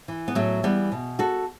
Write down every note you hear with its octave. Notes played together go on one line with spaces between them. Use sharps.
E3
B3
A2 F#3 A3
E3 G3 B3
B2
F#4 A4